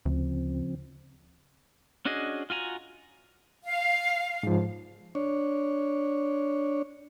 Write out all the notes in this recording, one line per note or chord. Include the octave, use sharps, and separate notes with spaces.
D2 C#3 F3 C4
C#4 D4 F#4 G#4 D#5
F4 F#4 G#5 A#5
F5
G#2 F3
D4 C#5